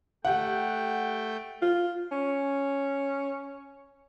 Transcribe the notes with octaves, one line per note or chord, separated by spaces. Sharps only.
A3 G4 F#5 G5
F4
C#4